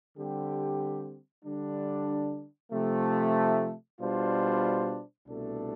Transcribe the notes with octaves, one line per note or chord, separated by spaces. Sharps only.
D3 G3 C4 G4
D3 G3 D4
C3 F3 A3
B2 G3 D4 F4 C5
C2 B2 A3 D4 A4